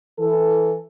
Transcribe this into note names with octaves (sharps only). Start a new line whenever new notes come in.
E3 A4